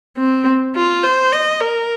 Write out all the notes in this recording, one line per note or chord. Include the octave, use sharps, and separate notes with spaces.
C4
F4
C5
D#5
A#4